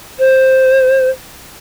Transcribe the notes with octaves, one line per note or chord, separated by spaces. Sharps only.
C5